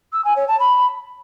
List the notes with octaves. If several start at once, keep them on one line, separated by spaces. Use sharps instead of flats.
E6
G#5
C#5
A5
B5